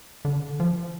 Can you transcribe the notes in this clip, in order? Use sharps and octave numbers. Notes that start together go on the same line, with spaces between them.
D3
F3